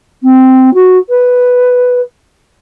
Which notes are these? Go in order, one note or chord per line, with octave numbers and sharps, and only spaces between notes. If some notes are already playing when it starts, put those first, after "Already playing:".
C4
F#4
B4